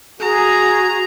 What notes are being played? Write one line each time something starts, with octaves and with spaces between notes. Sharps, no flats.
F#4 G#4 A#5